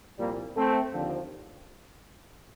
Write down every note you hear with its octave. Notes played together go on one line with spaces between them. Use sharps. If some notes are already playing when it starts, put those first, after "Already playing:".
C2 A#2 F3 G3 A#3
A3 C4
D#2 D3 F3